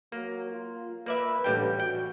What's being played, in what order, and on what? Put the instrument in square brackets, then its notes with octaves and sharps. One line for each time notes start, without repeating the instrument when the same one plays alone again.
[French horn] F#3 [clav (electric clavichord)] A#3
[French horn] F4
[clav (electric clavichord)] A#3 D5 E5 [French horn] B4
[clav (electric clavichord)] A1 G3 G5 [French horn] D3
[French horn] F#4 [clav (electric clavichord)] G5